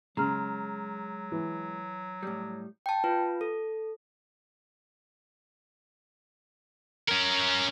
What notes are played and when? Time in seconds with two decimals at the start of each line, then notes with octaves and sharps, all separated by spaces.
0.17 C#3 F#3 G#3 A#5 F6
1.32 E3
2.23 A2 G3
2.86 G5 A5
3.04 F4 B4
3.41 A4
7.08 C#4 A#4